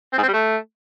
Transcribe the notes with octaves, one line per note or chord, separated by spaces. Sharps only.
C4
G#2
C4
G3
A3